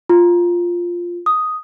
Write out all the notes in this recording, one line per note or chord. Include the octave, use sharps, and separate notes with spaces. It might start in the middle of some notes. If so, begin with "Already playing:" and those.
F4
D#6